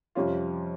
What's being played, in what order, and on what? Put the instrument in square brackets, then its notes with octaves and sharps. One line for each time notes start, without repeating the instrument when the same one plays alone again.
[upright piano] F2 C3 G3 C#4 F4